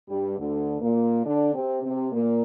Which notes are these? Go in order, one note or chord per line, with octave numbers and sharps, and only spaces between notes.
G2 G3
D2 D3
A#2 A#3
D3 D4
C3 C4
C3 C4
A#2 A#3